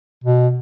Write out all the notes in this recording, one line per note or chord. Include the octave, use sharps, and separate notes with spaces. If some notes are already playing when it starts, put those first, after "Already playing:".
B2